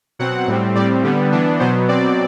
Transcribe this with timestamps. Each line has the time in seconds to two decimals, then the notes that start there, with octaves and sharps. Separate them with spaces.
0.19 B2 F#3 C4 F#5
0.47 A2 G3 C4
0.75 A2 G3 C4 D5
1.04 D3 G3 B3
1.32 E3 B3 D4
1.59 B2 F#3 B3 C5
1.88 B2 F#3 C4 D5